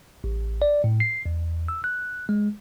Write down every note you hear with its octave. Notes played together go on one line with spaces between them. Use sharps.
A1
D5
A2
C7
E2
E6
F#6
G#3